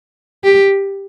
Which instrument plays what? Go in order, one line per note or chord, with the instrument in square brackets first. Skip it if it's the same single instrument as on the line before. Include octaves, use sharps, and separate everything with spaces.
[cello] G4